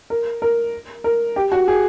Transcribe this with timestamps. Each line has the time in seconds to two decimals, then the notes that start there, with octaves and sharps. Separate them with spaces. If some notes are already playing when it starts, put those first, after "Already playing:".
0.10 A#4
0.42 A#4
1.04 A#4
1.36 G4
1.52 F#4
1.68 G#4